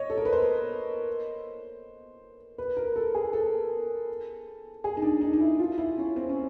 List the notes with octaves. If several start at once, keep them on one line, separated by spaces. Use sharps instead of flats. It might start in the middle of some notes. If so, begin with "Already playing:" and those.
Already playing: C#5 D#5
A4
A#4
B4
C5
B4
A#4
A4
G#4
A4
G#4
D#4
D4
D#4
D#4
E4
F4
E4
C#4
C4
C#4